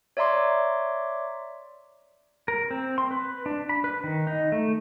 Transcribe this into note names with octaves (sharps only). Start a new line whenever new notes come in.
C#5 D5 E5 A#5 C6 D6
A#4
C4
C6
B4
D4
B5
B4
D#3
D#4
A3